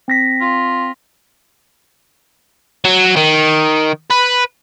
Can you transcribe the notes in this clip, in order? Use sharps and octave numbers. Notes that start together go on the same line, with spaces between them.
C4 A#6 B6
F4
F#3
D#3
B4